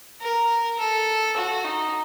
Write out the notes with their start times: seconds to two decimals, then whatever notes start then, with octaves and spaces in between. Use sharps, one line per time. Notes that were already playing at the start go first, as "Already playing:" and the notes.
0.22 A#4
0.79 A4
1.37 F#4
1.64 D#4